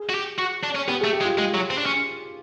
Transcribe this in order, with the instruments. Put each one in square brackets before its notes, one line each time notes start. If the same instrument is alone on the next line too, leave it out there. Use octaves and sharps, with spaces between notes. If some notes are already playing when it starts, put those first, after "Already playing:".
Already playing: [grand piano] G#4
[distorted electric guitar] F#4
G4
F#4
D4
C#4
[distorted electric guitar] B3 [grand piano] G4
[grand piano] G#4
[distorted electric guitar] A3
[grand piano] G4
[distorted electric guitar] G#3
[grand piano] F4
[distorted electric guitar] G#3 [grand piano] F4
[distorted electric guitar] F#3
C4
D4
C#4